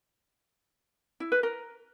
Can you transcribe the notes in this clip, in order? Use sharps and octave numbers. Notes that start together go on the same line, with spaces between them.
E4
B4
A#4